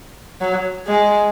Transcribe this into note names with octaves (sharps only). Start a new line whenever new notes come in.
F#3
G#3